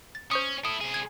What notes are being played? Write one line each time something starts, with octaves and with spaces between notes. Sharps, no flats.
A6
C#4 C5 C#6 D#6
E4 A4 D#6
C2 G#4
G#6